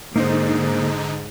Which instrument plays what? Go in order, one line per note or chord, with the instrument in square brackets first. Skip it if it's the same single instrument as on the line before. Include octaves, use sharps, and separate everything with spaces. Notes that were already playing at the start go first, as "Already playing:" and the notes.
[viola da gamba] G#2 [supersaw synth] D3 D#4 [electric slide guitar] A#3 C5